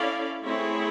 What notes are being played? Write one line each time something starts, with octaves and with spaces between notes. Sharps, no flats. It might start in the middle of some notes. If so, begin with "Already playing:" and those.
Already playing: C#4 E4 A4 D5 F5
A3 C4 E4 G#4 C#5